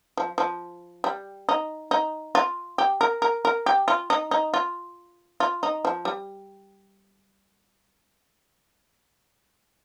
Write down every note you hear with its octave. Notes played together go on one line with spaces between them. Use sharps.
F3
F3
G3
D#4
D#4
F4
G4
A#4
A#4
A#4
G4
F4
D#4
D#4
F4
F4
D#4
F3
G3